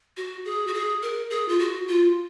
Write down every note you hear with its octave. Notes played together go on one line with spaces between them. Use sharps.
F#4
G#4
F#4
G#4
A#4
G#4
F4
F#4
F4